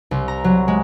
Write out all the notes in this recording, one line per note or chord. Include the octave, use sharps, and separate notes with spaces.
C2
A#5
F#3
G#3